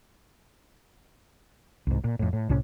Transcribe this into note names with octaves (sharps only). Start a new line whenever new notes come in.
C2 G#2
A#2
F2 A2
A2
C2 A2 C3 C#4